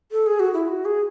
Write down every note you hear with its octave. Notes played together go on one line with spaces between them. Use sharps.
A4
G#4
F#4
E4
F#4
G#4